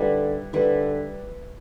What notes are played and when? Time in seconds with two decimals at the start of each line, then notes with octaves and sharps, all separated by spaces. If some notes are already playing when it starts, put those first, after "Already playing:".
Already playing: D3 G3 E4 B4
0.53 D3 G3 E4 B4